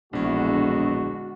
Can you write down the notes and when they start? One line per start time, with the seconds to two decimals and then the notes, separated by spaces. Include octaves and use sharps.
0.13 E1 A#1 D3 G#3 E4 F#4